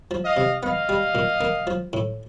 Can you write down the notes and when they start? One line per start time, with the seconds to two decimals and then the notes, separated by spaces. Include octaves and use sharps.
0.11 F3
0.24 D#5 F5
0.37 C3
0.63 B3 D#5 F5
0.89 G3
1.15 A#2
1.41 A#3
1.67 F3
1.93 A2